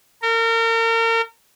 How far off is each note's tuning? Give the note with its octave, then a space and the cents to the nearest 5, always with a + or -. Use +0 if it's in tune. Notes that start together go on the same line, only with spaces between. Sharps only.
A#4 -35